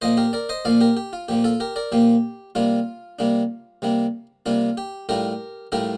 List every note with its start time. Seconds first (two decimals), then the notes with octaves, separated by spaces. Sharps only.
0.02 A#2 F3 A#3 C5 D#5
0.17 G4 A#4
0.33 A#4 D5
0.49 C5 D#5
0.65 A#2 F3 A#3 D5 F5
0.81 G4 A#4
0.97 G4
1.13 F4
1.28 A#2 F3 A#3 G4
1.44 F4 A4
1.60 G4 A#4
1.76 A#4 D5
1.92 A#2 F3 A#3 G4
2.55 C3 G3 A#3 D4 F4
3.19 C3 G3 A#3 D4
3.82 C3 G3 A#3 D4
4.46 C3 G3 A#3 D4 F4
4.77 G4
5.09 A2 G3 D4 F4 G4 A#4
5.72 A2 G3 D4 F4 G4 A#4